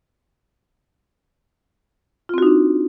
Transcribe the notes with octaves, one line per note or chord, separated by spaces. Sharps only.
C4 D4 D#4 F4 F#4